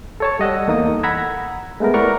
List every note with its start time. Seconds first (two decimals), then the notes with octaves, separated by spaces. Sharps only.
0.20 A4 C#5 A5
0.39 G3 D#5 F#5 E6
0.68 E2 A#3 D#4 A4 D#6
1.03 F#5 A#5 B5 E6 G#6
1.80 G#3 A3 B3 A#4
1.94 E4 A#4 B4 D5 F#5 C#6